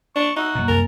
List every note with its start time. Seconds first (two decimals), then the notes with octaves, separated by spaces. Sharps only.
0.16 D4 C#6
0.36 D#4 F#4 E5 E6
0.55 F#2 B2 F#3 A#3
0.68 C2 F#2 A#4 G#5 A6